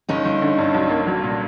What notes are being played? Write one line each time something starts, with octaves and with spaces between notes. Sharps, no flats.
G1 C#4 D#4
G1
D3
G2
B1
A#3
F#3
A#2